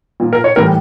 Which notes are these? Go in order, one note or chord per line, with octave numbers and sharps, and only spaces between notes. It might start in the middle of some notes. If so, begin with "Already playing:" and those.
A#2 F3
A#4
C#5
A2 E3 G3 A#4